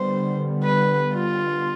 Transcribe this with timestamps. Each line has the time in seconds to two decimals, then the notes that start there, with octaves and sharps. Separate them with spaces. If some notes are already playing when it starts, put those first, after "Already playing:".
Already playing: D3 G3 B3 C5
0.64 B4
1.14 F4